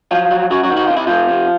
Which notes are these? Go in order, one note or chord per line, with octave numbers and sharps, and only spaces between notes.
F3 F#3 F4
F#3
F#2 F#3 F#4
F#3 F#4
D#3
F#4
C3 F4
E4
C3 F3 F4
C3